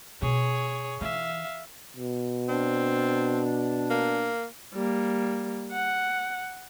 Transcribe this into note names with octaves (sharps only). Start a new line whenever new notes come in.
B2 G#4 C#5
E3 E5 F5
B2
C4 D4
A#3
G3 A#3
F#5